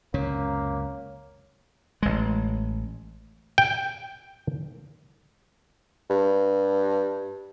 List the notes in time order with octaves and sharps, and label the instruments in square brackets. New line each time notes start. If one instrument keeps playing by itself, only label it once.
[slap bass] C#2 F#2 C3 [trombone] A#3 [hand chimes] C#4 [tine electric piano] C#5
[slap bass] A1 G#3
[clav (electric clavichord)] G5
[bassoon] G2